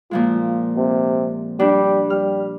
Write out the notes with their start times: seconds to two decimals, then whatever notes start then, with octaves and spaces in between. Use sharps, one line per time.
0.11 A#2 F3 G#3 F4
0.76 C3
1.59 G3 D4
2.10 G3 F6